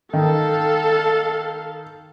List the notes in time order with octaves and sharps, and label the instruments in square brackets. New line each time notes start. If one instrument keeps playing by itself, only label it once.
[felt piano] D#3 [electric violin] A4 F5